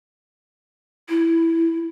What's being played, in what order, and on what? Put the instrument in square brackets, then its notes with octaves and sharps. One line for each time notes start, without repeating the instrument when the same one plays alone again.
[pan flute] E4